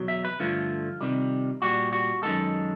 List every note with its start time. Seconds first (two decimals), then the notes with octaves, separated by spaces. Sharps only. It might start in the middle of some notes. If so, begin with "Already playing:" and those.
Already playing: E2 B2 F#3
0.08 E5
0.25 B4
0.40 G2 D3 F3 A3 F4
1.01 C3 D#3 G3
1.62 A#2 G3 F#4
1.93 F#4
2.23 F#2 D#3 G#3 A4